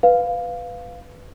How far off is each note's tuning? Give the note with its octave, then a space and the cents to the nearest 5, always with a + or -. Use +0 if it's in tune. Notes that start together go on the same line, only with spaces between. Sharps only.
B4 +10 F5 +0